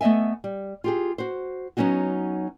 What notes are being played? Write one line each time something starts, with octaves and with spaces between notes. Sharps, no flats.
A3 B3 D#5 E5 G#5
G3
F4 G4 G#4
F#4 C5
F#3 B3 C#4 D#4 F#4